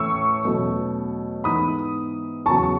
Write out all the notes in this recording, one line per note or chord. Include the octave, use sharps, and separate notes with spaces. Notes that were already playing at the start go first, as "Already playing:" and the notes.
Already playing: A2 E3 A3 C#4 C#6 E6
E2 B2 F#3 A3 C#4
G#2 E3 B3 B5 D#6
E2 C#3 F#3 B3 A5 C#6
C#6